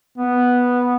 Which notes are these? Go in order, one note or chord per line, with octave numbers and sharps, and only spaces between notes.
B3